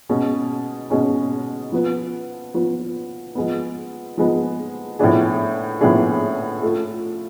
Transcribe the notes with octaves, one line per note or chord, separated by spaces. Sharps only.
B2 G#3 C#4
B2 G#3 C#4
F3 B3 F4 B4
F3 B3 F4 B4
F3 G#3 B3
F3 G#3 B3
A2 F3 B3 D4 G#4
A2 F3 B3 D4 G#4
A3 F4 A4